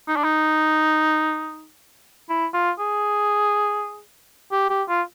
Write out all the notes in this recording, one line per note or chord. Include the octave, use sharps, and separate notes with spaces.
D#4
D4
D#4
E4
F4
G#4
G4
G4
F4